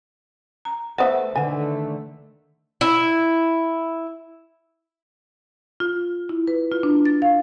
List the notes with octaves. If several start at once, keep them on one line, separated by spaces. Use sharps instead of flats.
A#5
A3 B3 B4 C5 D#5 E5 F#5
D3 D#3 A3 B4 F#5 G#5
E4
F4
E4
B4
F4
D4
A6
F5